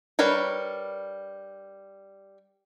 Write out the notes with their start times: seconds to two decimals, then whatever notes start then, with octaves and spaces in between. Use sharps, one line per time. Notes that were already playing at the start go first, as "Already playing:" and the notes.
0.19 G3 D4 A#4 B4 C#5